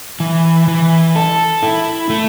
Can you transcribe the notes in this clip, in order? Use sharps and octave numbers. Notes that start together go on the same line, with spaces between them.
E3
E3
A4
E4
A3